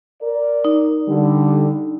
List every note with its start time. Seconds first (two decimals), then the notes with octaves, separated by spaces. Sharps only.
0.22 A#4 D5
0.65 D#4
1.09 D3 G3